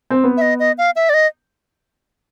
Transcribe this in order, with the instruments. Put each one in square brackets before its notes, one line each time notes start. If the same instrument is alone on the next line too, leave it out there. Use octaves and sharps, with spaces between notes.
[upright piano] C4
B3
[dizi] E5
D#5
D#5
F5
E5
D5
D#5